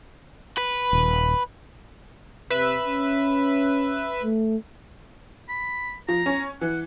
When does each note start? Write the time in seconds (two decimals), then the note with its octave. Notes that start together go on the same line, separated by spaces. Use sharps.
0.58 B4
0.93 D#1
2.50 C3 B4 E5
2.85 C#4
4.23 A3
5.49 B5
6.08 F3 A#5
6.26 C#4
6.61 E3 F#5